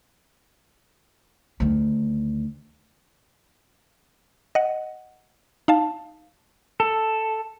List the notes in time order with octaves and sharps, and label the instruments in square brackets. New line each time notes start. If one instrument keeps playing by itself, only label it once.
[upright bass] D2 D#3
[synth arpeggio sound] D#5 F#5
D#4 F5 A5
[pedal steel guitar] A4